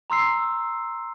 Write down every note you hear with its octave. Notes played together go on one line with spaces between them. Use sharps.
A#5 C6 E6 C7